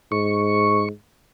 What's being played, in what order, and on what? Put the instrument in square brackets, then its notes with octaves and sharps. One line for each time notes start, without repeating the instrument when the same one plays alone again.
[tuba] G#2 [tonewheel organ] C#6